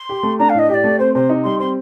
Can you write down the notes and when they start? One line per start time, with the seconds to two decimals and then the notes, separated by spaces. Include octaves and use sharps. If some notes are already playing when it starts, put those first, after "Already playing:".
Already playing: C6
0.09 G4
0.23 A3
0.39 D4 A#5
0.50 F5
0.55 A2 D#5
0.69 G4 D#5
0.74 D5
0.84 A3
0.99 C4 C5
1.15 C3 C5
1.29 D#4
1.44 G3 C6
1.60 C4 C6